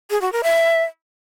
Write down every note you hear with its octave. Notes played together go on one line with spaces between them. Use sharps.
G#4
F#4
A#4
E5